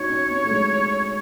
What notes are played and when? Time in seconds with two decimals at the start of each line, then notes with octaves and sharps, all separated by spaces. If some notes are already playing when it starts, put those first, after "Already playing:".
Already playing: D#4 F#4 C#5
0.09 C#4
0.30 B3
0.45 A3
0.51 G#3